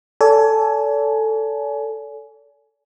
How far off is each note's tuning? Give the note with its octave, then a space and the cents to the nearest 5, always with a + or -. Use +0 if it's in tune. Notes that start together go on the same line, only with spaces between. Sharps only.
A4 +5 D5 -45 G#5 +20